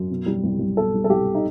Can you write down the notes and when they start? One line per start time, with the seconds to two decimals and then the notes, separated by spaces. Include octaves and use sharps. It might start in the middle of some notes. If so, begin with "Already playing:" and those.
Already playing: F#2
0.10 B2
0.26 G3
0.44 C2
0.59 C2
0.77 B2 A4
0.94 G3
1.04 A4
1.10 C2 G4
1.35 D#4